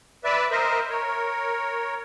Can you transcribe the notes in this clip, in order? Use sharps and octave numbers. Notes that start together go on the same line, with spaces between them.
B4 D5 E5
A#4 C5 D#5 E5
A#4 C#5